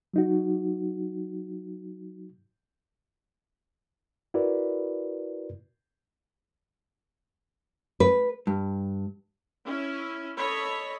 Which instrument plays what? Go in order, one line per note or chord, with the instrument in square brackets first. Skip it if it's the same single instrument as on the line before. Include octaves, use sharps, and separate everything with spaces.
[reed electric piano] F#3 D#4 F#4
E4 F#4 A#4 B4 D5
[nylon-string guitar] B4
[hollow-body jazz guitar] G2
[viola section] C#4 E4
A4 C#5 D#5 B5